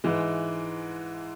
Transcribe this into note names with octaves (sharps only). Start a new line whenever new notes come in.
G#2 E3 G#3